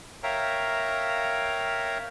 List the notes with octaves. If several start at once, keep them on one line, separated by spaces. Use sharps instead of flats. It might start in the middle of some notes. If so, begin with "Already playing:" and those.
A#4 C#5 E5 F5 G5 A#5